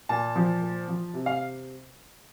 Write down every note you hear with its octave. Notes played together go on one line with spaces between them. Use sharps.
A#2 A5
F3
A#2
F3
C3
F5